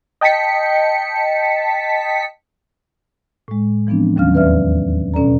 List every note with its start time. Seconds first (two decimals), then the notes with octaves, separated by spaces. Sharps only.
0.21 D#5 G5 A5 B6 C#7
3.48 A2 G#3
3.87 E3 F3 B3 C4 D4
4.16 D#2 D#3 F#3 C#4 F5 F6
4.34 E2 B4 D5 E5 F6
5.14 B2 C#4 A4 D5 A#5